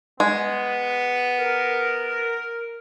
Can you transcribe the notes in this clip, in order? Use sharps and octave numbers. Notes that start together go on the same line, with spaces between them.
G#3 B3
A#4